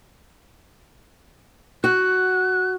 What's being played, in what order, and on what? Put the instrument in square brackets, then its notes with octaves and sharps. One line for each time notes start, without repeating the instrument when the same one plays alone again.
[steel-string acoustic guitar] F#4 [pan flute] F#6